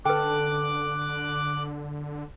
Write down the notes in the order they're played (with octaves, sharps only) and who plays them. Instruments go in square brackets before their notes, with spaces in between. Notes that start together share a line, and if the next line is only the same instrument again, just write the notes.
[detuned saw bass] D3 [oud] C#4 A4 [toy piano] B4 G5 [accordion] D6 F#6